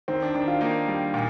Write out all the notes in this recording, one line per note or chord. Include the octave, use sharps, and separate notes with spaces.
D#3 C4
D4
D#3 D4
F4
A#3 D#4
G3
A#2